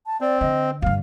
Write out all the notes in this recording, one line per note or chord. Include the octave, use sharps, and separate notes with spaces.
A5
C4 D5
D3 D#5
G2 D3 F5